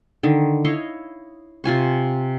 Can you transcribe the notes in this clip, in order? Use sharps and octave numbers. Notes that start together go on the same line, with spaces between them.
D3 D#3
E4 C#5 D#5 F5
C3 F4 G#5 C#6